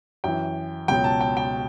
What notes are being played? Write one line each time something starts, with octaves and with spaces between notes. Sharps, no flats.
F#2 E3 G5
C#2 B2 F#3 G5
A5
G5
G5